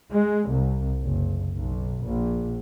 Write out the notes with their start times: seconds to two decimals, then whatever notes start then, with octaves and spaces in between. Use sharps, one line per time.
0.11 G#3
0.49 C2
1.02 F#1
1.53 B1
2.04 A#1